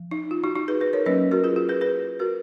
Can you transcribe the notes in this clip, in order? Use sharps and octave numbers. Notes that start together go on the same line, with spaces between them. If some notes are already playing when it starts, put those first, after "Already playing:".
Already playing: F3
D#4
F4
D#4 F#4
D#4 F#4
G#4 B4
G#4 B4
A#4 C#5
F#3 A#3 C#4 B4 D#5
F#4 A#4
F4 G#4
F4 G#4
G#4 B4
G#4 B4
F#4 A#4